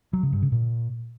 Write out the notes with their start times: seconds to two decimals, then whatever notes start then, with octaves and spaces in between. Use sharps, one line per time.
0.13 F#3
0.23 C#3
0.33 G2
0.42 C#3
0.52 A#2